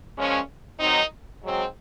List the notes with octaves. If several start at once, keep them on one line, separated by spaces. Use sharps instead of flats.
A#2 F3 G#3 C#4
D#3 F#3 C4 D#4
G#2 F#3 C4